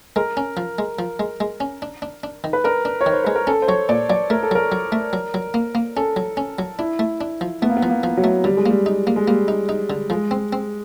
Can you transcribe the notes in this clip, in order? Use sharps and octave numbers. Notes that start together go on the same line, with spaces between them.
G#3 A#4
C#4
F3
G#3
F3
G#3
G#3
C#4
D4
D4
D4
D#3
B4
D4 A#4
D4
C#5
D#3
C5
G#3 B4
A#4
C#4 A4
C5
F#3 C#5
A#2 D5
F#3 D5
A3 A#4
A4
F#3 A#4
F#3
A3
F#3
F#3
A#3
A#3
C#4 A4
F#3
C#4
F#3
D4 E4
A3
D4
F3
A3 B3
A#3
B3
F3
A#3
F3
F#3
A3
D3 G3
G#3
G3 A#3
D#4
A#3
G#3
G3 A#3
D#4
D#4
D3
F3 G#3
C4
C4